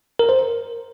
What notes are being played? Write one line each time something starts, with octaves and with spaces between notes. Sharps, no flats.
A#4
C5